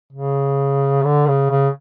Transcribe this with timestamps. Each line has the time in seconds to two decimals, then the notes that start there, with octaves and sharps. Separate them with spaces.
0.13 C#3
1.05 D3
1.27 C#3
1.50 C#3